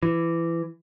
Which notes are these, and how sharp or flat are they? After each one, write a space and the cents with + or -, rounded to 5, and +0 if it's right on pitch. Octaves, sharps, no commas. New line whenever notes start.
E3 +20